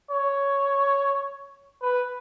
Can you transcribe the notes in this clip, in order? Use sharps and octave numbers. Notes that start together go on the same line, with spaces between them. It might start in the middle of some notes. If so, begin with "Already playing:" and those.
C#5
B4